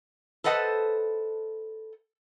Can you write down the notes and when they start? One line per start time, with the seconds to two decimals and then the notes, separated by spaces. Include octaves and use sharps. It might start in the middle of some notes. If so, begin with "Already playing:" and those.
0.44 A4 B4 C5 D#5 F#5 A5